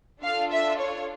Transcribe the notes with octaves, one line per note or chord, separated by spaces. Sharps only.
D4 F4 A4 F5
E5
C#5